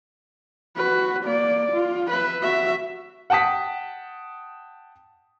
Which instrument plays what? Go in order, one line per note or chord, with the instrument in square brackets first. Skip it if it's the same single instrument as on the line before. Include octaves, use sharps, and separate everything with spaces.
[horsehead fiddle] F#4 B4
A#3 D5
F4
B4 E5
F#4 E5
[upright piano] F#5 G5 A5 D#6 B6